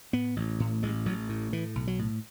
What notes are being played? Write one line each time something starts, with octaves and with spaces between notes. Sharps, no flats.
A2 B3
A1
A2
A1 G#3
A1 F#3
A2
A2 E3
B1
F#3
A2